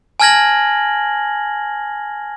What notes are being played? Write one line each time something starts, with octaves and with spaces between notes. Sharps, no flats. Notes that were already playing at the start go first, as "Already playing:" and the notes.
G#5 A5 F6 G#6 A#6 F#7